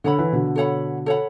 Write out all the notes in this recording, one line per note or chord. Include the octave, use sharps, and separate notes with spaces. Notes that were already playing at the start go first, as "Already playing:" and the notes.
D3 A4 C#5 F#5 B5
E3
B2 D3
A4 C#5 F#5 B5
A4 C#5 F#5 B5